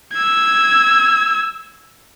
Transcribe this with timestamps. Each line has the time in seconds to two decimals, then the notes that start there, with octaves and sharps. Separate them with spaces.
0.14 E6 G#6